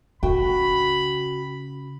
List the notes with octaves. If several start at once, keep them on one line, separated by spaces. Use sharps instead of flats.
C#3 F#4 G5 B5